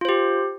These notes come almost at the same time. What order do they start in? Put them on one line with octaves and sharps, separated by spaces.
F4 C5 G4